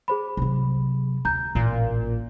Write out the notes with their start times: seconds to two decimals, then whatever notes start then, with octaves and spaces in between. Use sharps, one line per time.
0.08 G#4 C5 B5
0.37 C3 F#3
1.25 D2 A#5 G6
1.55 A1 A#2